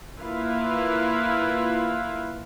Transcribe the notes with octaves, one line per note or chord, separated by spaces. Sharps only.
A#3 E4 F4 B4 F5